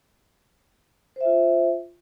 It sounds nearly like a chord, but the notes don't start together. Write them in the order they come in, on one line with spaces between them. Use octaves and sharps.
C5 E5 F4